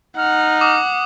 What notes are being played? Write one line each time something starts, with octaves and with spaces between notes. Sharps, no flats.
D#4 F#5 F6
D6 D#6